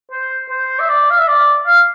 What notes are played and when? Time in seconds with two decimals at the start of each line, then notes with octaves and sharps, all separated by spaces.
0.11 C5
0.50 C5
0.80 E5
0.89 D5
1.10 F5
1.19 E5
1.27 D5
1.66 F5